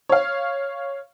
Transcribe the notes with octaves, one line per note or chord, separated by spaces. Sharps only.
C#5 F5